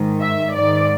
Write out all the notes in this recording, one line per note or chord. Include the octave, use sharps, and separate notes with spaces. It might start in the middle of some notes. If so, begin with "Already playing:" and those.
Already playing: G#2 D#3
E5
G#2 D#3 D5